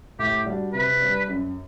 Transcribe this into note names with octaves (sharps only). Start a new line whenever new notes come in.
A2 G4
G3 D4 F#4
C3 B4
G3 D4
F#2